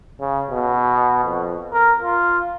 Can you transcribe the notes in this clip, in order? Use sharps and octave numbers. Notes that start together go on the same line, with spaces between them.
C#3
B2
F2
A#4
F4